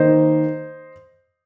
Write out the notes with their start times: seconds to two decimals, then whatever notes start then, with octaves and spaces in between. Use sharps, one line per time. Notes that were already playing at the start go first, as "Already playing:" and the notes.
Already playing: D#3 A#3 D#4 C5 D#5